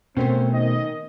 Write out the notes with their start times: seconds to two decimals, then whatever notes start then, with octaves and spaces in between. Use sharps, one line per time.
0.17 B2 A3 C4 C#4 A#4 C5
0.52 D#3 D#5